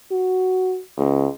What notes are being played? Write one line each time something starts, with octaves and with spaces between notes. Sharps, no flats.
F#4
C#2